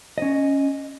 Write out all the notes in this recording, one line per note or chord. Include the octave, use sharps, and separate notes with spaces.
C#4 D#5